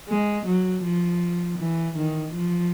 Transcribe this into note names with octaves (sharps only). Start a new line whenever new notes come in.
G#3
F#3
F3
E3
D#3
F3